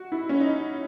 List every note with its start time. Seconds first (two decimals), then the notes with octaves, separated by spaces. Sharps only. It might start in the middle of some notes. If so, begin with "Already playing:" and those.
Already playing: F#4
0.12 E4
0.29 C#4
0.40 D#4